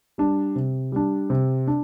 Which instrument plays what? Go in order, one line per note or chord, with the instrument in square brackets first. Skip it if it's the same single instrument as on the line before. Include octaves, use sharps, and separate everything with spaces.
[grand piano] G3 D4
C3
G3 D4
C3
D4